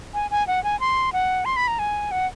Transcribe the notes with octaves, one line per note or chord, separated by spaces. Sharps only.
G#5
G#5
F#5
G#5
C6
F#5
C6
B5
A#5
G#5
F#5